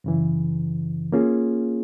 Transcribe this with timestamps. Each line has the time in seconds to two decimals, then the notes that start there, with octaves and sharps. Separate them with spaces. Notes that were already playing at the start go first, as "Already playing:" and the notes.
0.04 F#2 C#3 E3
1.12 A#3 C#4 F4 G#4